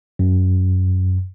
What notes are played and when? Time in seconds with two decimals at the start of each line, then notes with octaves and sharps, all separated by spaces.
0.19 F#2